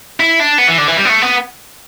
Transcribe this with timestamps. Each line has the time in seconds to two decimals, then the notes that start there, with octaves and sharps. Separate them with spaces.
0.20 E4
0.40 D4
0.58 B3
0.68 E3
0.78 D3
0.88 E3
0.97 G3
1.05 B3
1.09 A3
1.22 B3